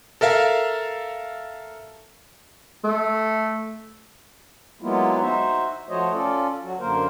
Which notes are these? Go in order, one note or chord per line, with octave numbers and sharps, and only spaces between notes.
A4 A#4 E5 F5
A3
F#3 G#3 A#3 B3 E4 F4
D#4 F#4 C5 E5
F3 A3 F#4 C5 C#5 D#5
C#4 F4 A4 D5
F#3 F#4
F#2 D3 A#3 A#4 C5